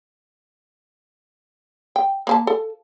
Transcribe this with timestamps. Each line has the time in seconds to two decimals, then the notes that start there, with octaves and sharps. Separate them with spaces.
1.96 G5
2.27 A#3 C5 A5
2.47 A4